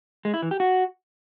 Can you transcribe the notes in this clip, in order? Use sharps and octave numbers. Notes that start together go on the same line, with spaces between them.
G#3
E4
E3
G4
F#4